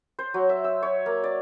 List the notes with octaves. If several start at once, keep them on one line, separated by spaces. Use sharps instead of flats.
C5
F#3
E5
E6
C#5
A#3
D5